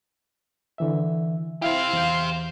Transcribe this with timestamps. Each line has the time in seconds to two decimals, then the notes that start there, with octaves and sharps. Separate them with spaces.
0.78 D3 E3 E5
1.62 E4 G4 C5 F5
1.93 E2 G6